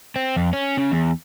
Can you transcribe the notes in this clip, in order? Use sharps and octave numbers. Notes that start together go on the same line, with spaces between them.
C4
F2
C#4
C#3
E2